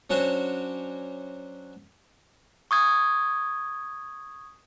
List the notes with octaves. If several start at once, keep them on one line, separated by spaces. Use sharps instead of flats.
F#3 C#4 D4 F#4 C5 C#5
C#6 D#6 G#6